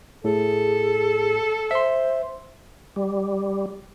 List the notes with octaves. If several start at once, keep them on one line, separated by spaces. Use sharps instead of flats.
A2 G#4 A4
C5 E5 C6
G3